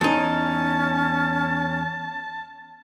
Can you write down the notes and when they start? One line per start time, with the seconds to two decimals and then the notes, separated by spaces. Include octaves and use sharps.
0.01 E2 C#4 D#4 A5